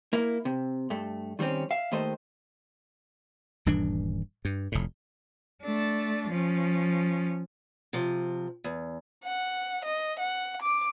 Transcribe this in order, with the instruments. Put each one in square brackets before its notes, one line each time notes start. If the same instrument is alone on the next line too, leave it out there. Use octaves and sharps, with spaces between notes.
[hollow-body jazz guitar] A#3 E4
C3
G2 A3
D#3 G3 A3 C4 C#4
E5 F5
D#2 D#3 A3 C5 D#5
[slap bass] D#1 G2 E3 D4
G2
F1 A2
[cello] A3 D4
F3 C#4
[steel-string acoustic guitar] C3 F3
E2
[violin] F#5
D#5
F#5
D6